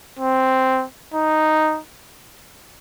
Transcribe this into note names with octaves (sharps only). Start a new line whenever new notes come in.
C4
D#4